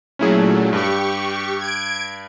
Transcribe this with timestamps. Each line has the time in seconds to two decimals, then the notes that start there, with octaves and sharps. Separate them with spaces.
0.19 A#2 F#3 A3 C#4 E4 G#4
0.73 G2 G4 C#6
1.58 G#6 D7